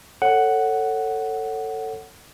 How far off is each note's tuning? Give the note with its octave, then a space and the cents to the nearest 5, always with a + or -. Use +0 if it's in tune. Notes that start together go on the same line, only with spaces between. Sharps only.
A4 +20 C#5 +0 F#5 +5